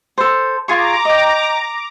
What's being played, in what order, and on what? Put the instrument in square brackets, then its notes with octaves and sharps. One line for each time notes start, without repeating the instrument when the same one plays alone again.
[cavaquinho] A4 C5
[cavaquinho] F4 G#4 C#6 [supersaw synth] A#5 D6
[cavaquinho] D#5 G5